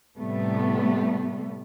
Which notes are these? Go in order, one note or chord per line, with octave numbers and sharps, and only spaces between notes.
A2 C3 G3 A3 B3